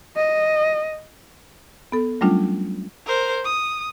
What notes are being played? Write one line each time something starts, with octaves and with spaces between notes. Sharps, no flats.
D#5
B3 A4
F#3 G3 A3 C#4 D4 F4
A#4 C5
D#6